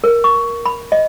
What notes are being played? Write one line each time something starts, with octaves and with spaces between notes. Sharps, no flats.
A#4
C#6
B5
D#5